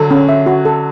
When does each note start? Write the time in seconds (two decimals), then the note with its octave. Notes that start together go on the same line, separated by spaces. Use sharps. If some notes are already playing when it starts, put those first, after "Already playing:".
Already playing: D3 F#3 A4
0.11 C#4
0.29 E5
0.46 F#4
0.65 A4